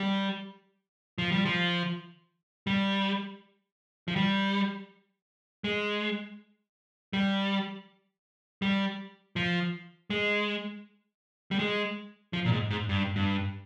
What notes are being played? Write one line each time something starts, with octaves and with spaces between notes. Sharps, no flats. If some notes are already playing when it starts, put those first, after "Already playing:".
Already playing: G3
F3
G3
F3
G3
F3
G3
G#3
G3
G3
F3
G#3
G3
G#3
F3
A#2
G#2
G#2
G2
G2